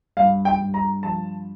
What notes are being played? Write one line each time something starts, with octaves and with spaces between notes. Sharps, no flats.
G2 F5
G5
G2
A#5
F3 A5